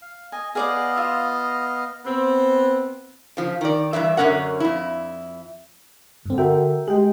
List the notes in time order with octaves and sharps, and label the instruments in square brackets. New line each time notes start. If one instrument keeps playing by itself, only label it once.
[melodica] F5
[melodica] D#5 [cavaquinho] G#5
[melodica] B3 D#5 F5 [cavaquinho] G#4 D5 F#5
[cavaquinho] F4 E5
[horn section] B3 C4
[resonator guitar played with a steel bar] C#3 F3
D#3 D5
G2 A#2 E3 E5
F#2 D3 G#3 C#4 A#4 F#5
F2 E4
[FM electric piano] G2 C4 [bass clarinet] D3
[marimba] F#4 F#5 [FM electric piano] A#4 E5 G5
[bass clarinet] G#3 [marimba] G4 [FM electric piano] G#4 G5